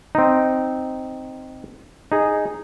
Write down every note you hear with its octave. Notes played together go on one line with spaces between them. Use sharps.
C4 D#4
D#4 G#4